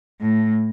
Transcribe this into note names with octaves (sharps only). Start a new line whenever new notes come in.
A2